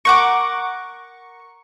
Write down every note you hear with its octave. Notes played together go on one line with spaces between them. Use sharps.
A#4 F#5 C#6 D6